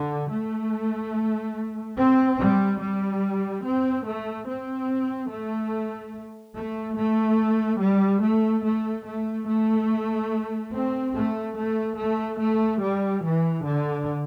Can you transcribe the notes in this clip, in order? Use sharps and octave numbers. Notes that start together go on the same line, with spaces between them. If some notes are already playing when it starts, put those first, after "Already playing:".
Already playing: D3
A3
C4
G3
G3
C4
A3
C4
A3
A3
A3
G3
A3
A3
A3
A3
C4
A3
A3
A3
A3
G3
E3
D3